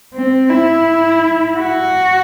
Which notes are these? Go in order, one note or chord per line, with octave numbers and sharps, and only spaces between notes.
C4
E4
F#4